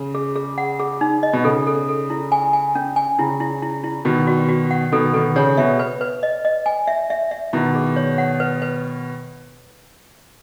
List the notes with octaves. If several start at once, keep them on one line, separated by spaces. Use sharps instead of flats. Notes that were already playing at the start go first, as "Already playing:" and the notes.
Already playing: C#3
G#4
G#4
F#5
G#4
D#4
D#5
B2
C#3 A4
A4
A4
E4
G#5
G#5
C#4
G#5
C#3 E4
E4
E4
E4
B2 D#3 F#4
F#4
F#4
F#5
B2 D#3 A4
B2 D#3 A4
C#3 C#5
B2 E5
B4
B4
D#5
D#5
G#5
E5
E5
E5
B2 D#3 E4
G#4
C#5
F#5
B4
B4